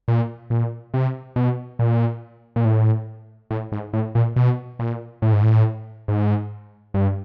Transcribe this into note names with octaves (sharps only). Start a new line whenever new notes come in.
A#2
A#2
C3
B2
A#2
A#2
A2
A2
G#2
A2
A#2
B2
A#2
A2
G#2
A2
G#2
G2